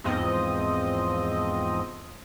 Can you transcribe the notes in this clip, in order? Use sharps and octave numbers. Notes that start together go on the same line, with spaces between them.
E2 G#2 F3 C4 D#5